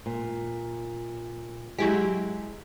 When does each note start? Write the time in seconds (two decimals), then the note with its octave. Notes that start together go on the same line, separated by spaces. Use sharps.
0.06 A#2
1.79 F#3 G#3 E4 G4